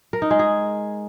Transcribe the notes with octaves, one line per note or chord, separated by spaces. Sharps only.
A#4
D#4
G#3
G#4